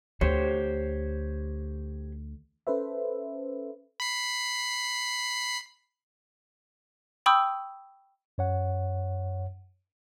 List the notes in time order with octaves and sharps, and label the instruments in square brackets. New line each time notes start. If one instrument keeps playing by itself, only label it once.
[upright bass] D2 [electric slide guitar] G4 C5 C#5
[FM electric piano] C#4 A4 B4 C5 E5
[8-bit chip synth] B5 C7
[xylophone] G5 B5 C#6 D#6 E6 G6
[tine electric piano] F#2 C#5 F#5